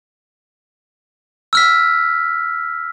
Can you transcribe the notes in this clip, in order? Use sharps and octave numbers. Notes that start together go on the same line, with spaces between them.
E6 F6 B6